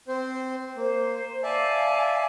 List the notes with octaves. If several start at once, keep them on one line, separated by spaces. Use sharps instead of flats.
C4 C5
A#3 C5
D5 E5 F5 G#5 A5